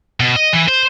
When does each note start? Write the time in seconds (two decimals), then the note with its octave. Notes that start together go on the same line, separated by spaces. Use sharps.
0.20 B2
0.36 D#5
0.53 E3
0.68 C5